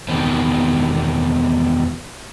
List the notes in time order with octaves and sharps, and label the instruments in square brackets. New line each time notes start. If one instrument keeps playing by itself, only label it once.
[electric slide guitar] E2 B2 D#3 C4